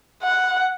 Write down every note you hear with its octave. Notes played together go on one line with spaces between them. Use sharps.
F#5